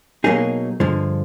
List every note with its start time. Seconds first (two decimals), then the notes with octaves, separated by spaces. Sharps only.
0.24 B2 F#3 A#3 D#4 G#4
0.80 G2 D3 F3 G#3